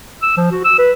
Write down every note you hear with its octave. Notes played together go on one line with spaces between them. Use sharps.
E6
F3
F#4
E6
B4